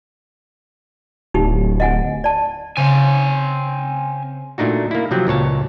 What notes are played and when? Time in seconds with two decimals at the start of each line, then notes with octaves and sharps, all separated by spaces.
1.34 D1 D#4 G4
1.80 D#5 F#5 G#5
2.24 D5 A5
2.77 C#3 C4 C5 F5 G#5
4.58 A#2 A3 D4 D#4 F#4
4.91 A#3 E4
5.11 C3 F3 F#3 C4
5.27 C#2 A#2 C#5 A5